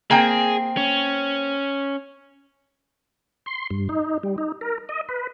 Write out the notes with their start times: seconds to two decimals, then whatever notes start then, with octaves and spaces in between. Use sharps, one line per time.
0.11 A#3 C4 G#4 G5
0.77 C#4
3.46 C6
3.71 G2
3.89 D#4
4.23 G3
4.38 D#4
4.61 A#4
4.89 D#5
5.09 B4